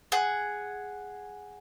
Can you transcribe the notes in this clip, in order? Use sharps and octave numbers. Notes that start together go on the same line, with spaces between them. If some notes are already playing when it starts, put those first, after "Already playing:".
G#4 F#5